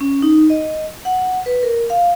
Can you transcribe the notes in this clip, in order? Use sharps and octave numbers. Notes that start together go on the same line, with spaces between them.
C#4
D#4
D#5
F#5
B4
A#4
F5